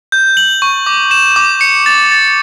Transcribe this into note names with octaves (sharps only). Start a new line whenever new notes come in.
G6
F#7
C#6
D6
E7
D6
C#7
A6
A6